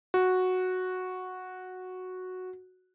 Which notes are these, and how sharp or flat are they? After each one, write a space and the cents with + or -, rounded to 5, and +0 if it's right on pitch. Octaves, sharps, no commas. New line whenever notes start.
F#4 -5